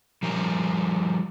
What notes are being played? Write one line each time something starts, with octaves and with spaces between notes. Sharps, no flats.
F3 G3 A#4